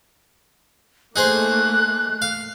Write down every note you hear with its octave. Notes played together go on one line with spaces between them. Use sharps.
A3 A#3 D#4 G#4 C5 F#6
F5